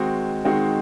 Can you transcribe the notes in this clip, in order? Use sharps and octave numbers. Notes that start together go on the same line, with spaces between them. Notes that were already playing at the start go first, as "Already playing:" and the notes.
Already playing: D#3 G#3 C4 D#4 F#4
D#3 G#3 C4 D#4 F#4